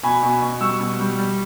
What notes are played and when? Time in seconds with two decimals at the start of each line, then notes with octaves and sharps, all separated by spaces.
0.03 B2 G#5 B5
0.23 B2
0.42 B2
0.60 G3 C#6 E6
0.80 B2
1.00 G3
1.18 G3